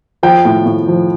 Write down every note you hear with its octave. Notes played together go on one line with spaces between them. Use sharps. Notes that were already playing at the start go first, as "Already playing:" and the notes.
F3 G5
A2
A2
F3